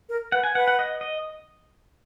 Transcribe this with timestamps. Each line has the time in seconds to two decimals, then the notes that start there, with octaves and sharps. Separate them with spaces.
0.09 A#4
0.32 B4 F#5
0.44 G#5
0.55 B4 F#5
0.68 F#5
0.79 D#5
1.01 D#5